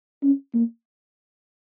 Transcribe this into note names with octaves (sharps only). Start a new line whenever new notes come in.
C#4
A#3